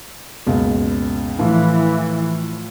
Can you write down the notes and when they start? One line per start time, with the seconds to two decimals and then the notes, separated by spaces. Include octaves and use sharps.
0.47 F#1 C#2 B2
1.39 A2 E3 F3